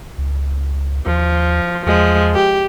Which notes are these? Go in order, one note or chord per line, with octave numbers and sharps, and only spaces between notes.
C#2
D#2 F3
E2 F3 G#3
G4